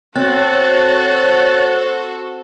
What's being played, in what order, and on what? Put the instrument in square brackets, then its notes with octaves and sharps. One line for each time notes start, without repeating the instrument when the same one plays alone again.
[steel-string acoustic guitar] C4 [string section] F#4 A4 C5 [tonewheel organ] C#5 F#6 A6